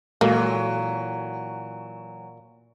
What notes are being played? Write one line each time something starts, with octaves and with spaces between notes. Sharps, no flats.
A#2 E3 F#3 G#3 A#3 F#4 A4